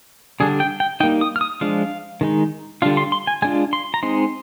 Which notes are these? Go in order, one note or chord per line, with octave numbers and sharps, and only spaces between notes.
D3 G3 D4 G#4
G5
G5
G3 A#3 D#4 G5
D#6
F6
D#6
F3 G#3 D4 F4 F5
D#3 G#3 D#4
D3 G3 D4 F4 F5
C6
C6
G#5
G#3 D4 F4 G#5
C6
A#5
G#3 C4 D#4 C6